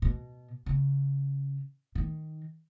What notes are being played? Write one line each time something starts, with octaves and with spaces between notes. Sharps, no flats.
B2
C#3
D#3